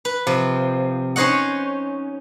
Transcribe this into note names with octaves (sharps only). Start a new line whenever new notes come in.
B4
C3 F3
C#4 D#4 C5 C#5 D#5 F#5